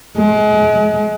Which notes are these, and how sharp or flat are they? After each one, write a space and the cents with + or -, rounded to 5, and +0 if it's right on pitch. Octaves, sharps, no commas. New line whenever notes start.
G#3 +35